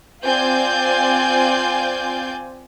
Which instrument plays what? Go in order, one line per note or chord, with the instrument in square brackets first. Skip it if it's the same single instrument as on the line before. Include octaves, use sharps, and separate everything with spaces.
[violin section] C4 F4 D5 G#5 G6